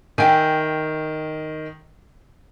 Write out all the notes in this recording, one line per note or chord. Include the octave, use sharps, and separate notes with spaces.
D#3 E5 G5 G#5